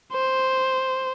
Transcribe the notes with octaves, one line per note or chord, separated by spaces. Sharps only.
C5